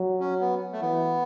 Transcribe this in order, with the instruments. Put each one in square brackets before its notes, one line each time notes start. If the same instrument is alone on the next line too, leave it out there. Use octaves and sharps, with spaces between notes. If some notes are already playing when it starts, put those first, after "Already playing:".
Already playing: [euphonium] F#3
[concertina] C#4
B3
A3
[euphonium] E3 [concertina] B3